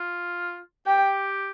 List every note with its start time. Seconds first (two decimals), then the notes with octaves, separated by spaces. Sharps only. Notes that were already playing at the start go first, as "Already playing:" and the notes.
Already playing: F4
0.87 G4 G5